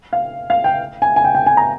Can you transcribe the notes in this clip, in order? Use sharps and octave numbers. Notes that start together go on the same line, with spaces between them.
F5
F5
G5
G#5
G#5
G5
G5
G#5
A#5